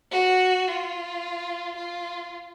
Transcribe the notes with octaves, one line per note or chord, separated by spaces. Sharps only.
F#4
F4
F4